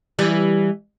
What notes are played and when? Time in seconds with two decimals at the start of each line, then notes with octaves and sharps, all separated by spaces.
0.19 E3 G3